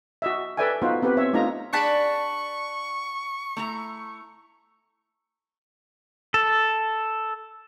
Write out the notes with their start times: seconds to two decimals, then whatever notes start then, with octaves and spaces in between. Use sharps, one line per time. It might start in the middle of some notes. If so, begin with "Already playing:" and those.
0.22 F#4 D#5 E5
0.57 A4 B4 D5 E5 G5 G#5
0.82 B3 D#4 F4 F#4 B4 C5
1.02 B3 C4 G4 B4
1.17 C4 C#5 E5
1.33 A3 D4 D#4 F4 A#5
1.73 D4 G#4 D5 F#5 A5 B5 C#6
3.57 A3 E4 A#5
6.34 A4